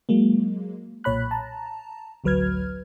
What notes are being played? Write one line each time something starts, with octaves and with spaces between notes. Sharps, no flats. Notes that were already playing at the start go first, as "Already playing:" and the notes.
F#3 G#3 A#3
B1 A#2 C#5 B5 F#6
A5 A#5
A1 D2 F#3 B4 F6 G#6